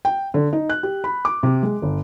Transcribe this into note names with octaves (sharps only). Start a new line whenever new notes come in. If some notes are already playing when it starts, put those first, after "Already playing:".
G5
D3
D#4
F#6
G4
B5
D6
C3
G#3
G1